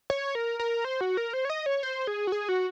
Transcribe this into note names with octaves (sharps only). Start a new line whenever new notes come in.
C#5
A#4
A#4
C5
F#4
A#4
C5
C#5
D#5
C#5
C5
G#4
F#4
G#4
F#4